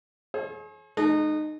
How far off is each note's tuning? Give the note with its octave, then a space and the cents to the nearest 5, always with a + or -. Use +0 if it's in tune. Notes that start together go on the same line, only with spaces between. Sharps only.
G#4 +40 C#5 -45
G#3 +45 D#4 -25